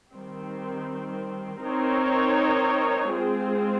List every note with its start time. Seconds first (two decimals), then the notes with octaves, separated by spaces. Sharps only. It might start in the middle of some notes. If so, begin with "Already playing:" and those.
0.12 D#3 G3 C4
1.62 C4 D#4 A#4 C#5
3.11 G#3 C4 F4 G#4